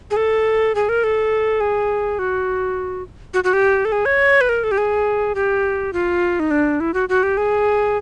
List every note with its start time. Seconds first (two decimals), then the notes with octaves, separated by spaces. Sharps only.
0.11 G#4
0.16 A4
0.75 G#4
0.89 A#4
1.04 A4
1.61 G#4
2.19 F#4
3.34 F#4
3.44 F#4
3.53 G4
3.85 A4
3.92 G#4
4.05 C#5
4.41 B4
4.49 A#4
4.64 A4
4.71 G4
4.78 G#4
5.35 G4
5.93 F4
6.40 D#4
6.51 D4
6.80 E4
6.94 F#4
7.09 F#4
7.23 G4
7.37 G#4